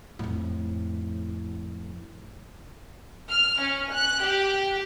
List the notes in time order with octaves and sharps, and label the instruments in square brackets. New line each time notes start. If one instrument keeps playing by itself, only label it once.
[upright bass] F2 A2
[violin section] F6
C#4
F#6
G4